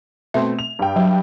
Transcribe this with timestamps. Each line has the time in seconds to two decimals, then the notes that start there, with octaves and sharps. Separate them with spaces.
0.34 B2 A3 C4 E5
0.59 F7
0.79 G2 G5
0.96 F#3